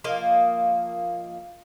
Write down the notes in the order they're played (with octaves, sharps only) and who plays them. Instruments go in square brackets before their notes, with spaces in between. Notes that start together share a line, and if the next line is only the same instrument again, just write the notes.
[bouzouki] F3 A#3 D#5 F5